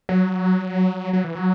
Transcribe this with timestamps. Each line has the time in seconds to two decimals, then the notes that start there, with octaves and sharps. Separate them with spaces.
0.09 F#3
1.13 F#3
1.24 E3
1.35 F#3